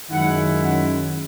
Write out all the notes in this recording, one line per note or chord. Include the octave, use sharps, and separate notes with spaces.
F#2 D#3 G#3 C#4 E4 F#5
F#5